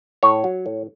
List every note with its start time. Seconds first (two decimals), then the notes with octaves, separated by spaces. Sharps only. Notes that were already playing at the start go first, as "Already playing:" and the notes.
0.23 A2 C#5
0.44 F#3
0.66 A2